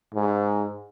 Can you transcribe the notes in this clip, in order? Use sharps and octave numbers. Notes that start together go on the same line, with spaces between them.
G#2